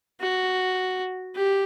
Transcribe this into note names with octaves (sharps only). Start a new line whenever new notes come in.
F#4
G4